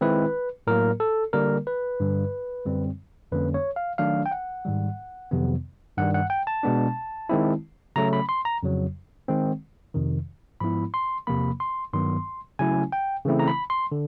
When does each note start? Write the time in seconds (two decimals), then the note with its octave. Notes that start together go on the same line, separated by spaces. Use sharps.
0.01 D#3 G#3 C4 E4 B4
0.67 A2 F#3 A#3 A#4
1.00 A4
1.33 D3 G3 A#3 A#4
1.67 B4
2.00 G2 D3 G3
2.66 F#2 D3 G3 C4
3.32 F2 D3 G3 A#3 C#4 B4
3.54 C#5
3.76 F5
3.98 D#3 F#3 A3 D4 F5
4.26 G5
4.31 F#5
4.65 G#2 D#3 G3
5.31 F2 C3 D#3 F#3 B3
5.97 G2 D#3 G3 F#5
6.14 F#5
6.30 G5
6.47 A5
6.63 B2 G#3 B3 D4
7.29 D#3 G#3 C4 E4
7.96 C#3 F#3 A3 C#4 A#5
8.13 B5
8.29 C6
8.45 A#5
8.63 F2 C#3 F#3
9.28 D#3 G#3 C4
9.94 F2 C3 D#3
10.60 G#2 F3 G#3 B3 E4 B5
10.94 C6
11.27 E2 C3 F3 A#3 B5
11.60 C6
11.93 G2 D#3 F#3 B3 C6
12.59 C#3 F#3 A3 C#4 E4 G#5
12.92 G5
13.25 C#3 E3 A3 C4 E4
13.39 A#5
13.48 B5
13.70 C6
13.92 D3